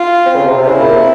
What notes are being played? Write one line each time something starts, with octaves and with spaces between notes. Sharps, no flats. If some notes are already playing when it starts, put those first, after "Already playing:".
Already playing: F4
C4
C#3
C3
C3
C#3 E4
A#2
C3